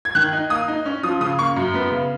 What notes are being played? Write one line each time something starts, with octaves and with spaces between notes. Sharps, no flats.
G#6
D#3 F#6
D#4
A#3 D#6
D#4
C#4
F3 D#6
C#3 D#6
A#3 C#6
F#2
B3
C#3